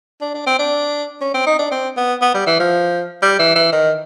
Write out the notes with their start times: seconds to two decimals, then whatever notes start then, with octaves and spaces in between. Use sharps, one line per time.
0.21 D4
0.34 D4
0.46 C4
0.59 D4
1.21 C#4
1.34 C4
1.46 D#4
1.59 D4
1.71 C4
1.97 B3
2.21 B3
2.34 G3
2.46 E3
2.59 F3
3.22 G3
3.39 E3
3.55 E3
3.72 D#3